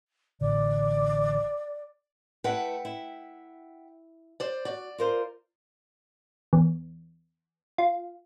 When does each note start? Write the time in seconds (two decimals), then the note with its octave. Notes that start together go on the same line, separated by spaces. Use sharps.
0.41 A1 D3 D5
2.44 A3 E4 B4 E5 F#5 G5
2.85 E4
4.40 C5 D5
4.65 F#4 D5
4.98 F4 A#4 C5
6.53 E2
7.78 F4